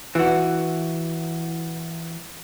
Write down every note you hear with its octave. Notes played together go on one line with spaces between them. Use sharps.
E3 F#4